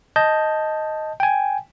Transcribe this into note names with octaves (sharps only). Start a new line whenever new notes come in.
D#5 A5 G6
G5 G#5